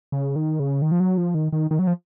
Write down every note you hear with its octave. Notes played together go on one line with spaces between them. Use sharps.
C#3
D#3
C#3
D#3
F3
F#3
F3
D#3
D#3
D#3
F#3
F3